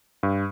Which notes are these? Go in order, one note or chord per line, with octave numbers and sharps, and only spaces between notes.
G2